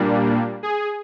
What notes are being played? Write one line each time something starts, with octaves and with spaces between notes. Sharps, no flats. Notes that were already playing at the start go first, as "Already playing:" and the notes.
Already playing: A#2 G3 A#3 D4
G#4